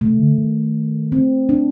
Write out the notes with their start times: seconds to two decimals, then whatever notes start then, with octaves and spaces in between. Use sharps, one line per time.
0.01 C3 A3
0.19 D3
0.38 D#3
1.12 C4
1.49 D4